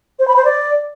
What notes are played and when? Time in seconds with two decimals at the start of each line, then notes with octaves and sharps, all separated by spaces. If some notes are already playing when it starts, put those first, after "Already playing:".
0.19 C5
0.28 B5
0.36 C5
0.45 D5